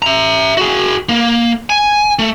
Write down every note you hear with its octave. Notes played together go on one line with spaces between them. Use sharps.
E5 A#5
F#4 G#4
A#3
G#5
A3